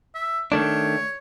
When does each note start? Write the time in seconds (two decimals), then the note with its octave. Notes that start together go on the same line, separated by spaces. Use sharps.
0.14 E5
0.52 D#3 A3 D4 C#5